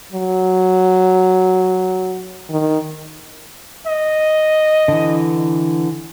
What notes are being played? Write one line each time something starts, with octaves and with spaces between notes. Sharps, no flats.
F#3
D#3
D#5
D3 E3